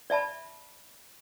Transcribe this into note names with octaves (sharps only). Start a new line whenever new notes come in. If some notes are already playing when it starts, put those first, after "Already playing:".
D5 E5 A5 B5